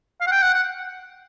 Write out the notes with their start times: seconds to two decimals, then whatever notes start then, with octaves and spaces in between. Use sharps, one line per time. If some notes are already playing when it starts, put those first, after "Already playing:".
0.21 F5
0.27 F#5
0.32 G5
0.42 F#5
0.54 F#5